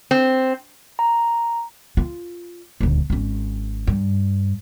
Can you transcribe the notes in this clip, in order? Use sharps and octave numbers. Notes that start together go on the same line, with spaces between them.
C4
A#5
F4
D#1 D2
G#1 C#4
G2